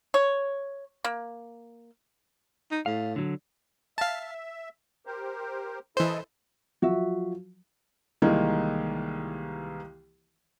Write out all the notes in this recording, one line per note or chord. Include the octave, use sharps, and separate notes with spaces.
C#5
A#3
D#4
A2 F5
D3 F#3
E5 F5 A5
G4 A#4 C5
E3 E4 A4 C5 D#5
F3 F#3 F#4 E5
C2 D#3 E3 G#3 A#3